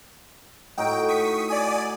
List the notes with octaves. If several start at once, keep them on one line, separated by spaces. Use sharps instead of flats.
A2 D#4 F#4 G5 D7
C#6 D#6 B6
D5 G#5 D#6